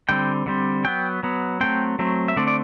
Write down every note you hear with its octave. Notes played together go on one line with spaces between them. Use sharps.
D3 G3 C4 G5
D3 G3 C4
F#3 B3 G5
F#3 B3
F#3 A3 C4 G5
F#3 A3 C4
E5
D3 A3 C4 D5
D5